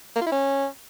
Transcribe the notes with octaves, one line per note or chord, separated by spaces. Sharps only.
A#3
F4
E4
C#4